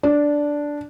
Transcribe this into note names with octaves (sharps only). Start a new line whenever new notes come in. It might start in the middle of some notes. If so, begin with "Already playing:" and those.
D4